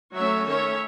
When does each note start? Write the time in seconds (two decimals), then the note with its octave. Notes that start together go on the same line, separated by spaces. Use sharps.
0.15 F#3 A3 C#4 C#5 E5
0.45 D#3 A3 C#4 C#5 E5